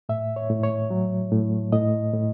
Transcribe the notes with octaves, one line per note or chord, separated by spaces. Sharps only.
A2 E5
C#5
A2
C#5
F#3
A2
A2 D#5
A2